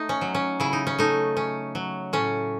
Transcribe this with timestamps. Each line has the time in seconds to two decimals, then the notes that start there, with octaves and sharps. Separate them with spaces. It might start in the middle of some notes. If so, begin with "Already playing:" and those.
Already playing: A3 D#4
0.09 C#4
0.21 F#3
0.35 C#4
0.60 C#3 E4
0.73 D#4
0.87 C#4
0.99 A3 D#4
1.37 C#4
1.75 F#3
2.13 A2 C#4